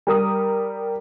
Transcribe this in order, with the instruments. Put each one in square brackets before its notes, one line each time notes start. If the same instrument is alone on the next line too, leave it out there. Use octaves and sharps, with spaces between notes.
[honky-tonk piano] G3 A#4 D#6